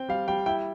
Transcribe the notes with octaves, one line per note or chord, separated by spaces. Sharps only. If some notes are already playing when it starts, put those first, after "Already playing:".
Already playing: C4 G5
G3 F5
G3 G5
E4 G5